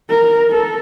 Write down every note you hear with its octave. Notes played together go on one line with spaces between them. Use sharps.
A#4
A4